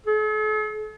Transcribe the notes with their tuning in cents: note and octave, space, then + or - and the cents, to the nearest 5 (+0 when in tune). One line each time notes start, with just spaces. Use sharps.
A4 -45